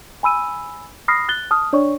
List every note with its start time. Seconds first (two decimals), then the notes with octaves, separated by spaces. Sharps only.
0.23 G#5 B5 E6 D#7
1.08 B5 D#6 F6 A#6 C7
1.29 F#6 A6 G7
1.51 A5 D#6 F6
1.73 D4 C#5 D5 C#6